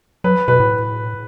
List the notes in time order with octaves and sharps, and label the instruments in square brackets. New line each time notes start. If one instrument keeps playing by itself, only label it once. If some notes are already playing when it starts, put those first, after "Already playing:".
[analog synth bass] F#3 [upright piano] B4
[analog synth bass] B2 [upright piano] B4
[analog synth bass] A2